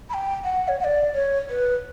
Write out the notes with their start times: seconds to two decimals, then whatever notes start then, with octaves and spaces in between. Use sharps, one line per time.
0.10 B5
0.14 G5
0.45 F#5
0.68 C#5
0.80 F#5
0.84 D5
1.14 C#5
1.50 B4